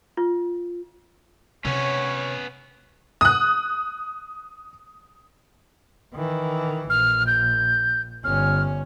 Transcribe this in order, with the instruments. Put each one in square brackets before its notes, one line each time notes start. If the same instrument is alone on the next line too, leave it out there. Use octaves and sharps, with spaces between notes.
[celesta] F4
[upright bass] C3 [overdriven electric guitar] B3 C#4 [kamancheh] C#5
[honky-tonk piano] D#6 F#6
[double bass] D#3 E3
[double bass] A#1 [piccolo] F6
[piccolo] G6
[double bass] G1 C#4 [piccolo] F6